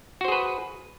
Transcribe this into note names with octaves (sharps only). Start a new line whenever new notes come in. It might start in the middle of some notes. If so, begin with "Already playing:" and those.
F#4 G#4 B4 C5